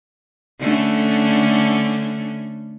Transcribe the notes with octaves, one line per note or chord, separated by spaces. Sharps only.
D3 A3 C#4